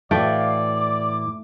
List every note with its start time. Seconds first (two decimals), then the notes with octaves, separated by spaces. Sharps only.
0.11 A2 E3 A3 F#4 D5 F5 G5
0.76 D6